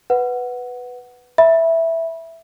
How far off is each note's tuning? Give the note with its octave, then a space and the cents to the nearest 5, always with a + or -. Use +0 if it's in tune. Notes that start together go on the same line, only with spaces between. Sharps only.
B4 +5 F#5 +0
E5 +0 B5 -25